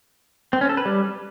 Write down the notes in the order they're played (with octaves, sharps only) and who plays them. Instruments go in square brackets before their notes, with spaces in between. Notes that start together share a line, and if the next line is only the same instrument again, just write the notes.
[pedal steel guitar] C4
C#4
A4
B4
G3